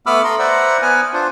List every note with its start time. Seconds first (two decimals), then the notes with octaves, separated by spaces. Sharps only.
0.06 A3 B3 B5 D6 E6 F6
0.24 A4 A#5 C6
0.39 B4 C5 D5 E5 F#5 A#5
0.82 B3 B4 G#5 F6
1.13 D4 F4 C5